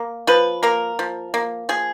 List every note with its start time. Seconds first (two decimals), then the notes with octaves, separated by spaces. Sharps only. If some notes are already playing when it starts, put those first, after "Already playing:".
Already playing: A#3
0.27 F3 B4
0.63 A#3 A#4
0.99 F3
1.34 A#3
1.69 F3 G#4